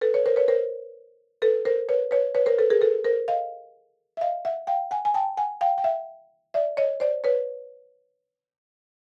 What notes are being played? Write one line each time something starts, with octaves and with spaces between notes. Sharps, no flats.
A4 B4
B4 C#5
A#4 C5
B4 C#5
A#4 C5
A4 B4
A#4 C5
B4 C#5
B4 C#5
B4 C#5
A#4 C5
A4 B4
G#4 A#4
A4 B4
A#4 C5
D#5 F5
E5
D#5 F5
E5 F#5
F5 G5
F#5 G#5
G#5
G5 A5
F#5 G#5
F5 G5
G5
E5 F#5
D5 E5
C#5 D#5
C5 D5
B4 C#5